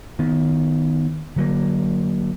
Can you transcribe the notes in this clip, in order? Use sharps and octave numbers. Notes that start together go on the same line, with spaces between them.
D#3 B3
D3 F#3 A#3